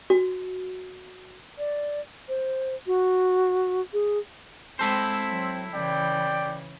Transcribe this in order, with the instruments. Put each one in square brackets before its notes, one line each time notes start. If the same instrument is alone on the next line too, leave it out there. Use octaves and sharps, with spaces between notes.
[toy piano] F#4
[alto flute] D5
C5
F#4
G#4
[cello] G#3 [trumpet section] C4 [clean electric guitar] E4 A4 C5
[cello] F#3
[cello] C#3 E3 [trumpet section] D5 G5